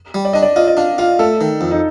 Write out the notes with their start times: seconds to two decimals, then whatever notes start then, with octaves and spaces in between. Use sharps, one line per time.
0.14 G3
0.25 D5
0.33 D4 D#5
0.42 D5
0.56 F4 D#5
0.67 D#5
0.77 D4 F5
0.98 F4 F5
1.19 A3 A4
1.41 D#3
1.61 F2
1.71 D#4